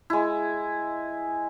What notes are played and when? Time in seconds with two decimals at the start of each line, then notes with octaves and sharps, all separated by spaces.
0.10 G#3 E4